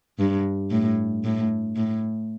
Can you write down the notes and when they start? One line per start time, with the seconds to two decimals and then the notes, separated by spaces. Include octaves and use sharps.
0.19 G2
0.71 A2
1.24 A2
1.76 A2